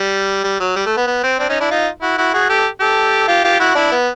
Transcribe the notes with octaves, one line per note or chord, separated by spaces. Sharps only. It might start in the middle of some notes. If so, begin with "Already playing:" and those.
Already playing: G3
G3
F#3
G3
A3
B3
B3
C4
C4 D4
C#4 D#4
D4 E4
D#4 F4
E4 F#4
E4 F#4
F#4 G#4
G4 A4
G4 A4
F4 G4
F4 G4
E4 F#4
D4 E4
B3